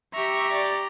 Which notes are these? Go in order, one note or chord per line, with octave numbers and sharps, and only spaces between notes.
G4 E5 A#5 C#6
D5